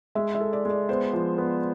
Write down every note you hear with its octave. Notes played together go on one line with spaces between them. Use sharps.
G#3 E5
E5
A4
D5
G#3 D5
B3 C5
F3
B3